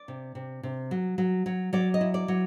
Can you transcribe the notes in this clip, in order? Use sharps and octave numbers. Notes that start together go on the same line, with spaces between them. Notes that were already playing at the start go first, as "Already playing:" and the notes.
Already playing: D5
C3
C3
C3
F#3
F#3
F#3
F#3 D5
D#5
E4
D5
F#3